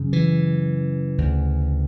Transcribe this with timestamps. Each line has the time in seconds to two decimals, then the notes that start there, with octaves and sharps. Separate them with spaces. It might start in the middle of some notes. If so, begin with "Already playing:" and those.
Already playing: F#2 C#3
0.13 E3
1.18 D2 C#3